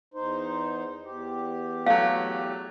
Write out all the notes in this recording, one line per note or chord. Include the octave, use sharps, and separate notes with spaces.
E2 D#4 C5
E2 G4
F#3 A3 F5